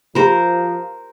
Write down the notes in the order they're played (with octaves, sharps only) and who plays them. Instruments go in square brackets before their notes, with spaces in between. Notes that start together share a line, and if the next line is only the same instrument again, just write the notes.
[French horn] F3 [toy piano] F4 G4 [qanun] A#4 C5